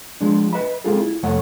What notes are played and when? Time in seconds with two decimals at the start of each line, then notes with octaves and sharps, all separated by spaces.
0.21 F3 G#3 D4
0.53 B4 D#5 E5 B5
0.84 G#3 C4 F4 G#4 A4
0.99 E4
1.23 C2 F2 F3 A3 C#5 F#5